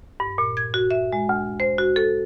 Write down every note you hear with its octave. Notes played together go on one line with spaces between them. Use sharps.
G2
A#2
G#6
F#4
E5
G#3
D2
C5
F#4
A4